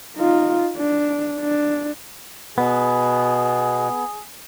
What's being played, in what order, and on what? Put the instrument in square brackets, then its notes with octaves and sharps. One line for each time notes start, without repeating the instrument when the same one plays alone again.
[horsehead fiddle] D#4 F4
D4
D4
[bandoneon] B2 [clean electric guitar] B3 [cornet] G#4